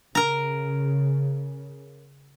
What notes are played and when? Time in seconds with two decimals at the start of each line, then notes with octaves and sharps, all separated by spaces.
0.15 C#3 A#4 A#5